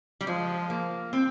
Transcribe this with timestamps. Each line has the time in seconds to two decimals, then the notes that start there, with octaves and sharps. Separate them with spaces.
0.21 G3
0.27 F3 G#3
0.70 A#3
1.13 C4